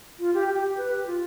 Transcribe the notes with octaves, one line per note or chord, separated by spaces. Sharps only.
F4
G4
G4
G4
B4
G4
F4